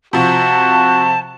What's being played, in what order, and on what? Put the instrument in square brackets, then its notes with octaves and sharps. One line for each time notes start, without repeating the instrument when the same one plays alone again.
[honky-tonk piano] C3 F3 [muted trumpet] F#4 [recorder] A5